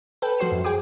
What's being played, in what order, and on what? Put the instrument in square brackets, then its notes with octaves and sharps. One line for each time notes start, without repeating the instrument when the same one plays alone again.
[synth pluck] A4 B4 G5
F3 F#4 C5 C7 E7
F#2
G#4 G5 G#5 D6